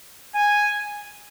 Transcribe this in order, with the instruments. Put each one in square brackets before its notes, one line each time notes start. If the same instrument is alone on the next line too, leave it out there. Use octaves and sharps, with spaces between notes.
[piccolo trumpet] G#5